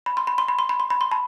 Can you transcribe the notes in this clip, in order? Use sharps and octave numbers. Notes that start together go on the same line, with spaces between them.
B5
C6
B5
C6
B5
C6
B5
C6
B5
C6
A5 B5